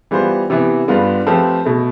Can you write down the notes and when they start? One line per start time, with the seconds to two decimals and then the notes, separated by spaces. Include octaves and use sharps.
0.11 E3 G3 B3 F4 C5
0.50 C3 E3 B3 E4
0.88 G2 D3 G3 B3 F4
1.27 F3 A3 C4 G4 B4
1.65 B2 A3